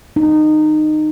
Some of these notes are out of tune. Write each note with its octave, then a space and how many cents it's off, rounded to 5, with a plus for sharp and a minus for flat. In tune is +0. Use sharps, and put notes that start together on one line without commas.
D#4 -20